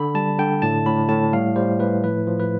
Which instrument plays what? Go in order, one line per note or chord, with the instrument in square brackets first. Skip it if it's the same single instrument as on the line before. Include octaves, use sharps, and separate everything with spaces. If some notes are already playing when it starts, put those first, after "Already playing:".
Already playing: [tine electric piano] D3 B5
G3 A5
D3 G5
A2 A5
A2 B5
A2 A5
G3 F5
G3 C5
A2 B4
F3 B4
F3
B4